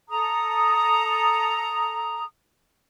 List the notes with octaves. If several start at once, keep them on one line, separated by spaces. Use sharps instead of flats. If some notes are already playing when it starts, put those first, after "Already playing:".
A4 A#5 D#6